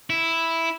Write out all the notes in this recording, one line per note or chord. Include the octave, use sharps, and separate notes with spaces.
E4